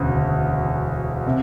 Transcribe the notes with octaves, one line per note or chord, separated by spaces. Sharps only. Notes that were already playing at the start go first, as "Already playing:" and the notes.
Already playing: E1 D2 C#3
C3